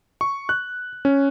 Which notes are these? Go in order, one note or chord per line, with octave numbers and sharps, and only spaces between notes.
C#6
F#6
C#4